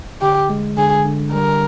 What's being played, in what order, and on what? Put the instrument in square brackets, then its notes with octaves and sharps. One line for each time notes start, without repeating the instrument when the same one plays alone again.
[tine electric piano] D3 [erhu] G4
[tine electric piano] G#3
[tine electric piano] D3 [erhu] G#4
[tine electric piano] D3
[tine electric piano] G3 [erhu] A#4